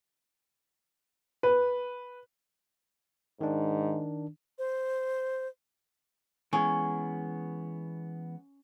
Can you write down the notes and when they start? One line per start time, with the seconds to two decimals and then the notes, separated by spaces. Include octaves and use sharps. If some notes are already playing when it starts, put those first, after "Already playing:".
1.43 B4
3.41 G#2 D#3 D4
4.59 C5
6.53 E3 G#3 B3 C#4